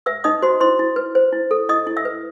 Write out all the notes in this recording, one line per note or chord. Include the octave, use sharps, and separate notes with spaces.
B4 E5 E6
D#4 D#5 D#6
F#4 C5 C6
E4 C5 C6
E4
B4
C5
E4
A4
E4 D#5 D#6
E4
E5 E6
B4